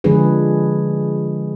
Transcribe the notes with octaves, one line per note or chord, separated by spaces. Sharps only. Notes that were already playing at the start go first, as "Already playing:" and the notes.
D3 F3 G#3 D4 G#4 B4